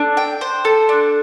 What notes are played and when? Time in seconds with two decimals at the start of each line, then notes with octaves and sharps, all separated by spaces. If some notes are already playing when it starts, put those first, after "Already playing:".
Already playing: D4 A4
0.17 G5
0.41 C5
0.65 A4
0.89 D4